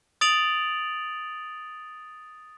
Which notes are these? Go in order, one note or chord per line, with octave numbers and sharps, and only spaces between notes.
D#6 A6 D7 F7 F#7